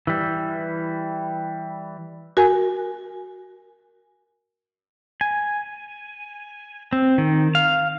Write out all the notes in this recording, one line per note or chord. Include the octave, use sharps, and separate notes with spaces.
E3 G3
F#4 A#4 G#5
G#5
C4
D#3
F5